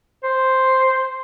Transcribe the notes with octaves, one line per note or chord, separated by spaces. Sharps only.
C5